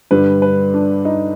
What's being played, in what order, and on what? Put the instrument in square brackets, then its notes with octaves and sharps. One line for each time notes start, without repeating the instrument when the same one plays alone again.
[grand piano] G2 D3 G3 B4
B4
D4
D#4